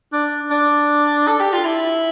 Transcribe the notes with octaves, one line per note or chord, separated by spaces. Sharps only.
D4
D4
A4
G4
F4
E4